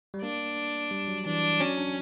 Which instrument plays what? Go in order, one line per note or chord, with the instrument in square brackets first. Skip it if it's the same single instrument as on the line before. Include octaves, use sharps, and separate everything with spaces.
[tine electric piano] G3
[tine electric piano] A#3 [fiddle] D4
[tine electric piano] G3
F#3
[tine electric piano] E3 [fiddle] D4
[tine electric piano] F#3 [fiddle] C#4
[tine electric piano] D4